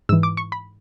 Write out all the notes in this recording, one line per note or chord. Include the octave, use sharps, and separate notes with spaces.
G#2 E3 E6
D6
C#6
B5